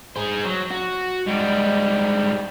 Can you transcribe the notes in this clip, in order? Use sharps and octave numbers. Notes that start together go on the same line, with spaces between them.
G#4 C5
F#3
F#4
G#2 G3